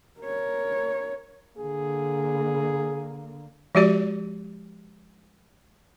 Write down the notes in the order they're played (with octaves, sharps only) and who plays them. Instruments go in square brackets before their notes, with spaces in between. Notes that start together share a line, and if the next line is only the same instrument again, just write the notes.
[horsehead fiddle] A#4 C#5
[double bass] D3 A#3 [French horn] G#4
[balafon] F3 G#3 F#4 G4 D5